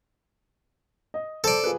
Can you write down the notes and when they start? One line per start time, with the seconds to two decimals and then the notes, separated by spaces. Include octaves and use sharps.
1.14 D#5
1.44 A4 C5 D5 A5
1.64 F4 G#4 B4